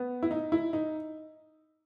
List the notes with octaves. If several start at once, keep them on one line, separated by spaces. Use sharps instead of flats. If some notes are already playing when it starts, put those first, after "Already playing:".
Already playing: B3
E4
D#4
E4
D#4